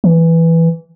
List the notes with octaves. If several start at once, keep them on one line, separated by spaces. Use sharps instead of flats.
E3